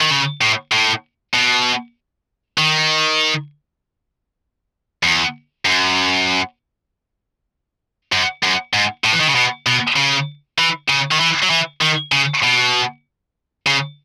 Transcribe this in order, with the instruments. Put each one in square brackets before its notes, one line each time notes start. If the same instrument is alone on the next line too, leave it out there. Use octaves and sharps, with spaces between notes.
[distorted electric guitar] D#3
C#3
A2
A2
B2
D#3
E2
F#2
F#2
F#2
G#2
A2
E3
D#3
C#3
B2
B2
C#3
E3
C#3
D#3
E3
F#3
E3
D#3
C#3
B2
C#3